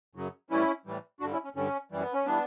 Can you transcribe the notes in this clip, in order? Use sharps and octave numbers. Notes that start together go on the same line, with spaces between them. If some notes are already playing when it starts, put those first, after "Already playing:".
F#2 C#3 F#3
A2 E3 G3 C#4 E4
A2 E3 G3
G2 D3 G3 D4 F#4
C#4 E4
C#4
G2 D3 G3 C#4
F#2 E3 G3
B3
C#4
E3 G3 B3 D4